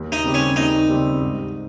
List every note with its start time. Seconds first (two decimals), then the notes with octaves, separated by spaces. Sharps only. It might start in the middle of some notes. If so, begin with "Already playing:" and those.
Already playing: D#2
0.12 D#4
0.24 C#3 G3 C4 G4
0.34 C#4
0.56 D#2 D#4
0.89 C#3 G3 C4 G4
1.22 G#2